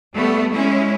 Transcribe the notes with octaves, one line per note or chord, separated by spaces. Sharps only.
G3 A3 B3
G#3 C#4 E4